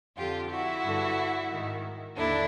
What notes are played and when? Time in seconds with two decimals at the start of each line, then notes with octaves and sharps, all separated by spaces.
0.17 F2 D3 F4 G4
0.51 E4 F#4
0.83 G2 D3
1.51 G#2 D#3
2.17 D#2 D3 D4 E4